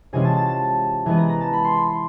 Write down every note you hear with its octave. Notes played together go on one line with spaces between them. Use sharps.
C3 E3 G#3 C#4 F4 G#5
A5
A5
A5
E3 G#3 B3 G#5
A#5
A#5
A5
B5
C6
B5
C6